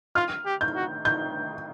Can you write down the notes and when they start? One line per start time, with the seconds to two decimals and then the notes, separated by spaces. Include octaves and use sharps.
0.15 F4 F6
0.46 G4
0.61 G6
0.76 F#4
1.05 G6